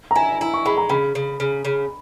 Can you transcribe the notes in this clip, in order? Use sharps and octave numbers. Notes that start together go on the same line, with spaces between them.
A#5
E4 G#5
E4 A#5
C#6
G#3 B5
A#5
C#3 B5
C#3
C#3
C#3